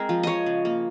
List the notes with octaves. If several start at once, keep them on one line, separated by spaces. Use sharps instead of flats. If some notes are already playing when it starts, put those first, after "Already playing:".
Already playing: G#3 C4 G#4 A#4
F3
F3 C#5 D#5
C#3
A#3